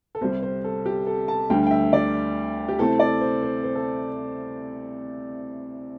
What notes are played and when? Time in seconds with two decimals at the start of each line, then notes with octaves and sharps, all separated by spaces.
0.15 A4
0.21 C2 C3 G3 C5
0.43 C5
0.64 A4
0.86 G4
1.07 A4
1.28 A5
1.50 D2 D3 G3 D4 G5
1.67 G5
1.71 E5
1.93 D5
2.68 G4
2.79 C3 A3 C4 E4 A4
2.99 D5
3.21 C5
3.43 C5
3.64 C5
3.75 A4